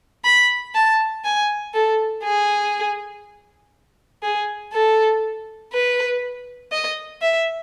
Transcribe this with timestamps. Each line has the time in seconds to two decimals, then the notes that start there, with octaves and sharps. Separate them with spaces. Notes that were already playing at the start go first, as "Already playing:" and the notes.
0.24 B5
0.75 A5
1.24 G#5
1.74 A4
2.24 G#4
4.23 G#4
4.73 A4
5.72 B4
6.72 D#5
7.21 E5